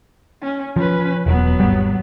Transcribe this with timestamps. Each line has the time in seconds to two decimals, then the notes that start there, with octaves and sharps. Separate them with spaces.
0.42 C#4
0.76 F3 C#4 B4
1.26 E1 F#3 B3
1.60 G#1 G3